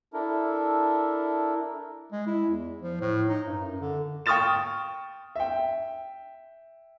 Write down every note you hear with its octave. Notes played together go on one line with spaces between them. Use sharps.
D4 E4 A4 A#4
G#3
E4
E2
F3
A2
D#4
G2
F#2
D3
G5 C#6 D#6 F6 A6 E7
E5 G5